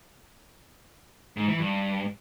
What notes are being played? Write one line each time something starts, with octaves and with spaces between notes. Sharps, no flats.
G#2
E3
G2